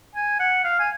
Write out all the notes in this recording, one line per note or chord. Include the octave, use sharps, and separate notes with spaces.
G#5
F#5
F5
G#5